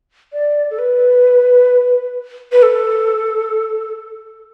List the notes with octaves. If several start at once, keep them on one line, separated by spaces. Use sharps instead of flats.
D5
A4
B4
B4
A4